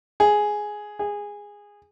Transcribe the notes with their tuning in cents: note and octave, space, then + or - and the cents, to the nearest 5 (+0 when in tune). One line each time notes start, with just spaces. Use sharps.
G#4 +5
G#4 -15